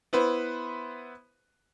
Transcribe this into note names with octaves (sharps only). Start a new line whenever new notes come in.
B3 E4 B4 C5